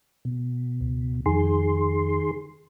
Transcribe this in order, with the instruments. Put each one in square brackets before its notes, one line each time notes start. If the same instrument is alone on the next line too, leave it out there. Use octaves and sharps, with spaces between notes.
[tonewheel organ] B2
[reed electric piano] C#2
[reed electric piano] F2 [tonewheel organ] D#3 G#4 C6